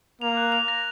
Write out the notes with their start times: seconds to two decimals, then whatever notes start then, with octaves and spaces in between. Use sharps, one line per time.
0.21 A#3 F7
0.37 F#6
0.52 F7
0.68 A#6